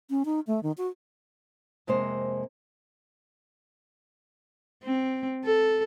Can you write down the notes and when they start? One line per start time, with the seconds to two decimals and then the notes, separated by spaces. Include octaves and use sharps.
0.10 C#4
0.25 D#4
0.47 A3
0.63 D#3
0.78 F#4
1.87 F2 C3 G#3 A#3 C5
4.84 C4
5.45 A4